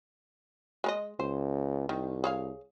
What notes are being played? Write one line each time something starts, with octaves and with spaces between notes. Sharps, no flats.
G#3 A#4 D#5
C#2 C5
C2 D#3
G#4 C#5 F5